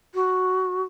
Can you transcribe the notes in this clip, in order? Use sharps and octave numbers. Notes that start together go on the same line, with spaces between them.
F#4